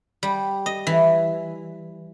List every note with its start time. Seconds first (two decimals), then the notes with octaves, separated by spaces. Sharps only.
0.23 G3
0.66 D#5
0.87 E3